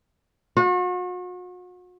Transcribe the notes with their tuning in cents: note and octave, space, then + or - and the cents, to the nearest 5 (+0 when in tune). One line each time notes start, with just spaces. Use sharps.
F#4 -40